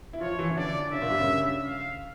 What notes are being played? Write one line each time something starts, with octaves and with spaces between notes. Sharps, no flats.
E4
F3 F4 C#5
E3 E4
C#4
D3 D4 D5
C#3 C#4 E5
A#2 A#3
G2 G3
C#3 C#4
F5